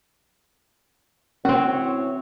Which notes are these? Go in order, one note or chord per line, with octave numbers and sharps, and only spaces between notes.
E3 C4 C#4 F#4 C#5